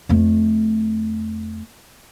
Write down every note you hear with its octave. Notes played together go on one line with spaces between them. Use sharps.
F2 A3